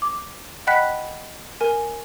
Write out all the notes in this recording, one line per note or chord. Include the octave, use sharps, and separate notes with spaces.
D6
D#5 F#5 G5 B5 F#6 B6
A#4 G#5